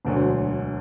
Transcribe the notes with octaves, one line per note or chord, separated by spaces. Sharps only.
E1 D2 D3 F#3